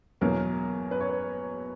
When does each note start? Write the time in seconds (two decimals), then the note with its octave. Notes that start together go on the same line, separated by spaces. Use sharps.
0.21 E2 B2 F#3 A#3 A#4
0.91 B4
1.01 C#5
1.09 B4